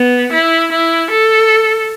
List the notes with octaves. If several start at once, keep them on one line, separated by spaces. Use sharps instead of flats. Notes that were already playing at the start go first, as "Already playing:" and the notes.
Already playing: B3
E4
E4
A4